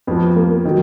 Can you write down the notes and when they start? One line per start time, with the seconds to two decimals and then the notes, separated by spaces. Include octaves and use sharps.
0.07 F2 F3 B3
0.36 A#3
0.65 D#3 F#3